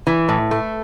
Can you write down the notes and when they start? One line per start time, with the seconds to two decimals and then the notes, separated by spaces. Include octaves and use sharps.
0.07 E3
0.29 A2
0.51 A3